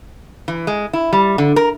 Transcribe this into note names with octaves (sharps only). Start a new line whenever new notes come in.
E3
G#3
E4
G3
D3
A#4